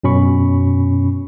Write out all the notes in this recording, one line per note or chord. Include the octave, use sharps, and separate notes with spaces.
F#2 B2 C#4 B5 C#6